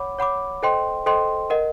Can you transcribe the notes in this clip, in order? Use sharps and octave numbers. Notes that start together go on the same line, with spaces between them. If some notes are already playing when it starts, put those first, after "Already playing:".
Already playing: C#5 F#5 B5 D6
C#5 F#5 B5 D6
A4 C5 D#5 G5 C6
A4 C5 D#5 G5 C6
A#4 D#5 F#5